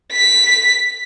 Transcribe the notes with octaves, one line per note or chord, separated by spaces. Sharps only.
B6